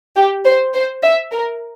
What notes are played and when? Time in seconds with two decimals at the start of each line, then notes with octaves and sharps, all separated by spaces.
0.16 G4
0.45 C5
0.74 C5
1.04 E5
1.32 A#4